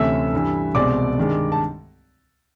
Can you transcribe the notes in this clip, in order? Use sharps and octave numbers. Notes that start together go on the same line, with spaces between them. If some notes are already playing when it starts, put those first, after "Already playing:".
Already playing: D2 C3 E3 A3 C#4 E5 E6
G2 E3 G3
C2 B2 G#3 C4 D5 D6
G2 D#3 G#3
A5